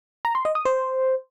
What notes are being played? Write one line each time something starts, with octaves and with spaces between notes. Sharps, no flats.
A#5
C6
D#5
D#6
C5